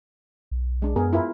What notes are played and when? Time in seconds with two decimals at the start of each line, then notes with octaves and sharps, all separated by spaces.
0.51 B1
0.82 G#3 D4
0.96 F#2 B3 G#4 A#4
1.13 E4 F4 A#4